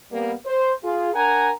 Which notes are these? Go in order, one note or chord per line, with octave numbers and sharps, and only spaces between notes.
G3 A#3 B3
C5
F4 G#4
D4 A#4 F#5 G#5 A#5